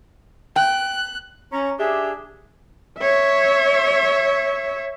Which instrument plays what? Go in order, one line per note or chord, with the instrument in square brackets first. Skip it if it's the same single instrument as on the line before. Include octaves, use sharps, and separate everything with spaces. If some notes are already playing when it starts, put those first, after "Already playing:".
[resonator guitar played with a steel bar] G5 [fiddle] F#6
[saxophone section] C#4 [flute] A#5
[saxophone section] D4 G4 E5 [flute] G#4
[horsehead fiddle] C#5 E5